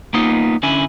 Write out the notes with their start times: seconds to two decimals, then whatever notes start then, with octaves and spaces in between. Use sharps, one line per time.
0.14 A#3 B3 D#4 F4
0.63 D3 C#4 E4 G#5